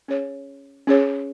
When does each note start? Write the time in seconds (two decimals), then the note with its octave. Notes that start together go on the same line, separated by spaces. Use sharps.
0.08 C#4 G#4 C#5
0.87 C#4 G#4 C#5